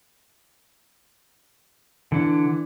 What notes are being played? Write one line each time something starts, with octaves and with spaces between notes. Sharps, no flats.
D3 E3 D4